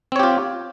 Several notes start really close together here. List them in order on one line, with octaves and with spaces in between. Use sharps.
C4 C#5 G4 F4